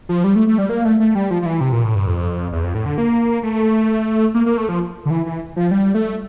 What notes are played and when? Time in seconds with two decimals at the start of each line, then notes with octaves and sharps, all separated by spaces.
0.09 F3
0.24 G3
0.36 A3
0.47 A3
0.58 G3
0.69 A#3
0.85 A3
1.00 A3
1.15 G3
1.31 F3
1.42 F3
1.46 E3
1.61 C3
1.72 A#2
1.84 A2
1.95 G2
2.07 F2
2.52 E2
2.63 F2
2.75 A2
2.86 D3
2.98 A#3
3.43 A3
4.34 A#3
4.46 A#3
4.58 A3
4.69 F3
5.06 D3
5.10 E3
5.26 E3
5.56 F3
5.71 G3
5.94 A3